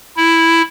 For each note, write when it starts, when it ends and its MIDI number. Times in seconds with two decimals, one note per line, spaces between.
0.17 0.62 64